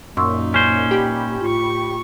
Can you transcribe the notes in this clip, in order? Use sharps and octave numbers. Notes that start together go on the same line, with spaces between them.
F#2 A#2 D#4 C6 C#6 E6
C#4 C5
G4 G5 B5
A2 F4 C#6